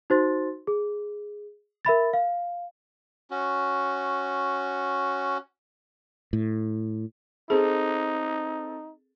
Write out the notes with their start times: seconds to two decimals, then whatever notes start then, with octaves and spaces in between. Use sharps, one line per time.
0.10 D#4 F#4 C5 C6 A6
0.67 G#4
1.85 A#4 E5 B5 A6
2.13 F5
3.31 C#4 F#4
6.33 A2
7.50 C4 D#4 G#4 A4